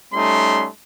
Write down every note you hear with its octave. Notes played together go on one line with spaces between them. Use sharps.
G3 A3 C#4 D#4 C6